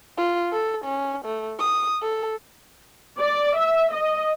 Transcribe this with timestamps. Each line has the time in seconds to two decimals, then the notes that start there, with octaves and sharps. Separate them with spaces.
0.18 F4
0.52 A4
0.85 C#4
1.25 A3
1.59 D#6
2.02 A4
3.20 D5
3.57 E5
3.92 D#5